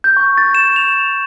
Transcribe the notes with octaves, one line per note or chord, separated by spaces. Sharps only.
G6
C#6
A6
E7
F7